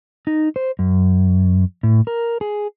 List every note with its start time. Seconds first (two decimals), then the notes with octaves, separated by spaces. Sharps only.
0.27 D#4
0.56 C5
0.79 F#2
1.83 A2
2.07 A#4
2.41 G#4